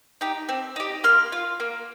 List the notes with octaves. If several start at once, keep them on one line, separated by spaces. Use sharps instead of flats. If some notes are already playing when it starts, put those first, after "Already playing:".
D#4 G4
C4
D#4 G4
A#3 C6 F6
F4
A#3